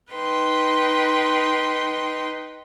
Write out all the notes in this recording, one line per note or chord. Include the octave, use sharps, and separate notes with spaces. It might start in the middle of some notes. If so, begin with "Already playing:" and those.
D#4 B4 G5 C6